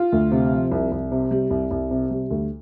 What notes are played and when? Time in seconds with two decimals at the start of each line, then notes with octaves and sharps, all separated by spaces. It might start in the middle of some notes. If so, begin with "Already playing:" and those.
Already playing: F4
0.12 D2
0.32 C3
0.52 F3
0.71 C2
0.92 C2
1.12 C3
1.31 G3
1.50 C2
1.71 C2
1.91 C3
2.11 G3
2.31 D2